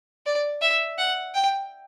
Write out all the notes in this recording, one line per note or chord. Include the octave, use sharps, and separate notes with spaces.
D5
E5
F#5
G5